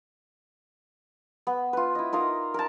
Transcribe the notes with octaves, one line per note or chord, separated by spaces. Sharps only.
B3
F4 B4
E4 D#5
D#4 F4 A#4 D#5
A#4 A5